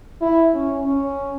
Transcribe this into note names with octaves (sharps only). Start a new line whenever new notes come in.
E4
C#4
C#4